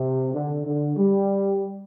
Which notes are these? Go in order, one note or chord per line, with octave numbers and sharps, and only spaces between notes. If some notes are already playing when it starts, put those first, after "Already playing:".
Already playing: C3
D3
D3
G3